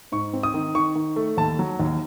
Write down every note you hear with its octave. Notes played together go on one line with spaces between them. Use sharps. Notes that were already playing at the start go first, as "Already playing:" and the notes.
G#2 C#6
C4
D#6
D#3
D#3 C#6
D#3
A3
D#2 A5
F#3
D#2